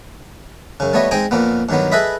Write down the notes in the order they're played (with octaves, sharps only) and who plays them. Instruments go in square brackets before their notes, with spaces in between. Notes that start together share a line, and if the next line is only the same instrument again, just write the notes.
[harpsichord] F#2 C#3
G3 A3 B3 C#5 D#5
G#3 C4 D#4 D#5 G5 G#5
F2 A#2 A#3 B3
G2 D#3 F#3 B3
G#4 A4 B4 D#5 E5 B5